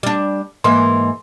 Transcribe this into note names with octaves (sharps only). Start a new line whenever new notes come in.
G3 D4
G#2 E3 A#3 C6